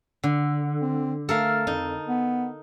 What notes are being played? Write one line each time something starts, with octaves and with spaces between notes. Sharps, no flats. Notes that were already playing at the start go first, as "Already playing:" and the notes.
D3
C4
A3 A4 A#4 F5
F2 D#4
B3